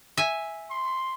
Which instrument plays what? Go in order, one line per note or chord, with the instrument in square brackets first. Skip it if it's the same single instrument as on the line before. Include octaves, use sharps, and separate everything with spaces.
[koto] E5 G#5
[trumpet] C6